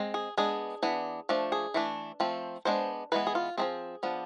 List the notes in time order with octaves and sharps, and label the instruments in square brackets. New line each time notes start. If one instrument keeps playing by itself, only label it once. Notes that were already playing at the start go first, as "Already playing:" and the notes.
Already playing: [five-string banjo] G#3 C4
G#4
G#3 B3 D4 G#4
E3 B3 D4
F3 A3 D4
G#4
E3 A3 D4
F3 A3 C4
G#3 B3 D4 C5
E3 G#3 B3 B4
G#4
F4
F3 A3 C4 G#4
F3 B3 D4